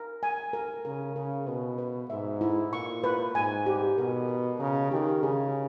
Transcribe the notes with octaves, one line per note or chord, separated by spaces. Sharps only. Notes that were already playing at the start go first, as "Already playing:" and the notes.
Already playing: A#4
G#5
A#4
C#3 A#4
C#3 A#4
B2 B4
B4
G#2 E5
E4
A#2 C#6
B4
G#2 G#5
G4
B2 A#4
A#4
C#3 A#5
D#3 G4
C#3 G#4